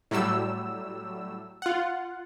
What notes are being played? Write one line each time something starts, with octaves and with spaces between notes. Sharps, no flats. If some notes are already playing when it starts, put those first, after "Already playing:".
A2 F#3 G3 E6
F4 F#5